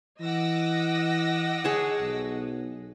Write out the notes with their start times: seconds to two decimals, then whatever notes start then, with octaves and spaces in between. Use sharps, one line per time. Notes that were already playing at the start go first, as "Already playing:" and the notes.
0.20 E3 D#5 F#5 D6 E6 A#6
1.64 G#4 C#5 A5
2.01 B1